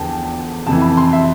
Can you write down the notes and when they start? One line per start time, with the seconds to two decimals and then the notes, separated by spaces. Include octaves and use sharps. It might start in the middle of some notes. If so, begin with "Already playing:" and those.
Already playing: E2 D3 F3 G5 A5
0.67 F2 C3 E3 A5
0.82 B5
0.97 C6
1.13 E5